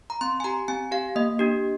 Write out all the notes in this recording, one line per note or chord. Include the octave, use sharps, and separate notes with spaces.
A#5
C4 C6
G#5
G4 A#5
C4 G#5
G4 F5
A#3 D#5
D4 G4